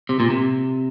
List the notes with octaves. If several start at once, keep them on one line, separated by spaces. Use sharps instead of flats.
C3
A#2
C3